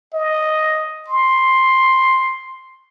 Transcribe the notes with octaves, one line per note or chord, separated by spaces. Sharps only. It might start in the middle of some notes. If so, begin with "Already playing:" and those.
D#5
C6